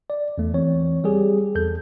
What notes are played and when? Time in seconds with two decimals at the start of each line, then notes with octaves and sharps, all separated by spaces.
0.10 D5
0.38 E2 A3
0.54 E3 C4 C#5
1.04 G3 G4 G#4
1.55 E2 A4 G6